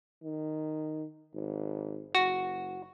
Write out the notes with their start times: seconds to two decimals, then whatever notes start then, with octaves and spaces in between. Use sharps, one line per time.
0.23 D#3
1.35 G#1
2.15 F#1 F#4